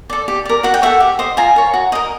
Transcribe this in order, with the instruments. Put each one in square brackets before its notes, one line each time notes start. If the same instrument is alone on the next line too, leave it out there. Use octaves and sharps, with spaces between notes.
[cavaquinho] A4 D5
G4
A#4 D5
F#4 F#5
G5
A4 C#5 E5 F#5
G4
C5 D#5
F4 G#5 A#5
A#4 C#5
F#4
A#4 D#5